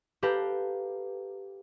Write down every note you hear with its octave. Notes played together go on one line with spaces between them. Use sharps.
G4 A4 B4 F5 G5 A#5